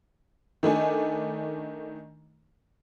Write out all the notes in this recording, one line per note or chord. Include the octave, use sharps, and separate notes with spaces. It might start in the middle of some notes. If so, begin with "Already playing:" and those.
D#3 A3 D4 G#5